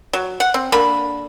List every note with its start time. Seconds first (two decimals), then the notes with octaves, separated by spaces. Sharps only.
0.13 F#3
0.40 F#5
0.54 C4
0.72 D3 A#3 B5